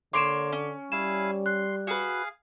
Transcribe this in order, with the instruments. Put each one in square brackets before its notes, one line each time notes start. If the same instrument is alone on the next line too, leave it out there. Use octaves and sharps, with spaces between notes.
[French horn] D3 [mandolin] A#3 C#5 C6 [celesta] D6 D7 E7
[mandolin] C#4
[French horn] G3 [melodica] E4 F5 G#5 [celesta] E7
[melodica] C6 [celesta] F#6
[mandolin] F#4 B4 [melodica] G#4 F5